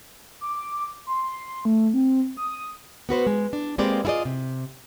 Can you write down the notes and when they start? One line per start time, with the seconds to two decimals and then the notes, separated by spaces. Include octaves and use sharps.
0.41 D6
1.07 C6
1.65 A3
1.93 C4
2.37 D#6
3.09 B3 F#4 B4 C5
3.27 G#3
3.53 D4
3.78 G#3 A#3 C4 G4 B4 D5
4.05 E4 F4 G#4 D5 D#5
4.25 C3